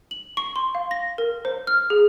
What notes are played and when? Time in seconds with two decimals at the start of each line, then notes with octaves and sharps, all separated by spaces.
0.11 F#7
0.37 C#6
0.56 C6
0.75 F5
0.91 A#6
1.18 A#4
1.45 C5
1.67 F6
1.90 G#4